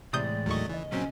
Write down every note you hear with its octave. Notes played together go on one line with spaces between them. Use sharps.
A2 C3 E3 G#3 D5 D#6 G6
D#2 F#3 A3 D#5 C#6
C#3 E3 D#5
A#2 F#3 C4 C#4